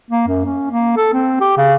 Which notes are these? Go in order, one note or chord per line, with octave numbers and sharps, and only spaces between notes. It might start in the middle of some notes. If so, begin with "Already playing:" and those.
A#3
F#2
C#4
A#3
A4
C4
G4
C#3